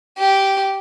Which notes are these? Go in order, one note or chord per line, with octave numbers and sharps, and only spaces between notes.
G4